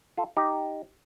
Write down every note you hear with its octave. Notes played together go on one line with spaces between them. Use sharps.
F4 A4
D#4 G4